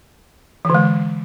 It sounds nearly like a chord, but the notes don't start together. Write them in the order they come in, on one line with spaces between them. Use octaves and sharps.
E3 D3 G#3